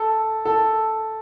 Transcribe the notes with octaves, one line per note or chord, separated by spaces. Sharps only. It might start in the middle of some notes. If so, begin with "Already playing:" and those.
Already playing: A4
A4